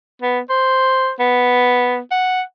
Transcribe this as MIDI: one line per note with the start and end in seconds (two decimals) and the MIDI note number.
0.22 0.40 59
0.50 1.11 72
1.20 1.98 59
2.11 2.42 78